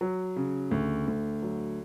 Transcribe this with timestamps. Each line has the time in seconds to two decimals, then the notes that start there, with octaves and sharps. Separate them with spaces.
0.01 F#3
0.36 C#3
0.71 D2
1.07 D2
1.43 F#3